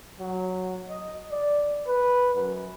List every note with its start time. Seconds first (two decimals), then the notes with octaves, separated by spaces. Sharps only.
0.20 F#3
0.88 D#5
1.31 D5
1.87 B4
2.35 F#2